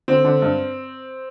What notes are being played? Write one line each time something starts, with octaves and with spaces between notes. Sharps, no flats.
D3 C4
D3
G2